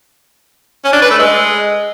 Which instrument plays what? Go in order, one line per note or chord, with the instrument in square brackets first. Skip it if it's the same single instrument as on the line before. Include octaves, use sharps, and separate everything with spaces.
[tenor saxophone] C#4
D4
B4
A3
G#3